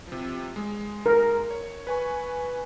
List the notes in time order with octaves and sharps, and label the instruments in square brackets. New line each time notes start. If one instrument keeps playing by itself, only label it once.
[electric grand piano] C3 F3
G#3
[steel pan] A#4
[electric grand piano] C#5
B4 G#5 C#6